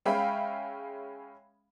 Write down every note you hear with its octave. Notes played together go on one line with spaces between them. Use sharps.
G#3 C#4 E5 F5 G5 B5